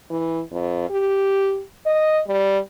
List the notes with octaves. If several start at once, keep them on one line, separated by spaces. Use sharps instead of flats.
E3
F2
G4
D#5
G3